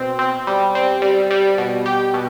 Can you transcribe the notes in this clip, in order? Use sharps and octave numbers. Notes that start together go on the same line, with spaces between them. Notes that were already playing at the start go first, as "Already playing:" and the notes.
Already playing: B2 C4
C4
G3
C4
G3
G3
B2
G4
B2